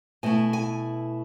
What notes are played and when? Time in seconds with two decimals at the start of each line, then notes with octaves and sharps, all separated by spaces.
0.23 B2 A3 E4 G#5
0.53 G#5